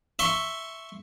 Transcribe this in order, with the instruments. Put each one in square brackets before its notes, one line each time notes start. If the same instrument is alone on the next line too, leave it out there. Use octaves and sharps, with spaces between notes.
[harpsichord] E5 C6 C#6